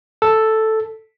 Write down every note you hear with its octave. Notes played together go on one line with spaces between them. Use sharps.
A4